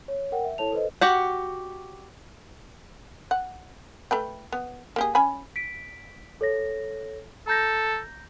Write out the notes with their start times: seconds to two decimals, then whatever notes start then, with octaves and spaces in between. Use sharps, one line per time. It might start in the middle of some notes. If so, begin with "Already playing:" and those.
0.08 C#5
0.32 A#4 F#5 G5
0.45 E5
0.58 E4 A4 C#5 A5 F7
0.72 A4 B4 C5 D#5
1.01 F#4 G4 F#5
3.31 F#5
4.11 A3 B4 G5
4.52 B3
4.96 A#3 G4 G#4
5.15 C#4 G#5 B5
5.56 B6 D7
6.41 A4 C#5 A#6
7.48 A4 A#5 G6 A#6